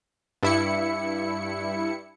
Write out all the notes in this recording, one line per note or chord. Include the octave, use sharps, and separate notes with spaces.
G2 E4 C#7